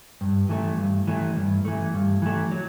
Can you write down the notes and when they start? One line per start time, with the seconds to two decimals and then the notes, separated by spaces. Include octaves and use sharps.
0.21 G2
0.49 E3 A3
0.78 G2
1.07 E3 A3
1.36 G2
1.65 E3 A3
1.94 G2
2.22 E3 A3
2.51 F#3